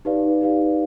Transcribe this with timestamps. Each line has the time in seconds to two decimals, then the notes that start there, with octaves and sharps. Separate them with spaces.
0.05 D#4 G4 B4 D5 F5
0.41 D#4 G4 B4 D5 F5